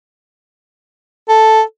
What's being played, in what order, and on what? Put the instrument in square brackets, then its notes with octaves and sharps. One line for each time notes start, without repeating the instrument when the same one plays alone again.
[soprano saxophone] A4